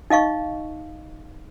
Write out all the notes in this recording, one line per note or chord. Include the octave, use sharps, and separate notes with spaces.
D#4 D#5 F5 C#6